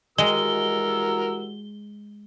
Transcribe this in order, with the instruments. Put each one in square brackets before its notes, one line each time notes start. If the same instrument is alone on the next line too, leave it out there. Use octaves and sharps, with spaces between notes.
[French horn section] E3 G3 F#4 [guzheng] G#3 [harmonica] A#4 E6 [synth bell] G7